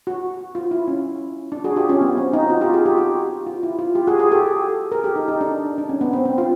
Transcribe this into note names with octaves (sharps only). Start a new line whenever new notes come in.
F#4
F4
E4
C#4
D4
F#4 G#4
F4 G4
C#4
B3
C4
D#4
F4
F#4
F4 G4
F#4 G#4
F4 G4
F#4
F4
E4
F4
F4 G4
F#4 G#4
F#4 G#4
G4 A4
G#4 A#4
G4 A4
D#4
D#4
D4
D4
C#4
B3
C4
C4
F4